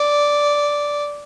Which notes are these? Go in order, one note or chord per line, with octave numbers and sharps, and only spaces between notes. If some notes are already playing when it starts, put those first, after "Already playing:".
Already playing: D5